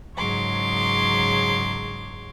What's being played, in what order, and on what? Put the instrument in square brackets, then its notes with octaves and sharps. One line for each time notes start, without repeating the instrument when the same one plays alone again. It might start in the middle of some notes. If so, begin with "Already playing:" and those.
[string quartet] G#2 C#3 F#3 C#5 C6 D6